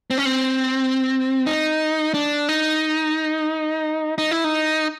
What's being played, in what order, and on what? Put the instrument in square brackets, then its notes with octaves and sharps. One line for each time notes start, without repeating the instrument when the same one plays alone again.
[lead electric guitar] C4
C#4
C4
D#4
D4
D#4
D#4
E4
D#4